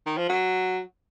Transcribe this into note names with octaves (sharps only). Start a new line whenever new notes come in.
D#3
F3
F#3